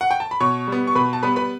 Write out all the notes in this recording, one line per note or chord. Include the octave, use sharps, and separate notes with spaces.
F#5
G5
A5
B5
B2 C#5 C#6
G3 B3
C#6
B2 B4 B5
A5
G3 B3 B4 B5
B4 B5